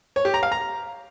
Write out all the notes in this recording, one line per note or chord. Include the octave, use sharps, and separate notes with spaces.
C#5
G4
A#5
F5
A#5